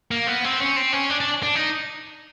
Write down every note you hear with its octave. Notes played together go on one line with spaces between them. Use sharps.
A#3
B3
C4
C#4
C4
C#4
D4
D4
D4
D#4